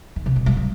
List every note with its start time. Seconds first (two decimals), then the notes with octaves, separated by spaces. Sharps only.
0.16 D#3
0.26 C3
0.36 B2
0.46 G3
0.57 F#3